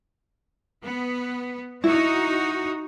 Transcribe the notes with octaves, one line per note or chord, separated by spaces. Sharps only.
B3
D#4 E4 F#4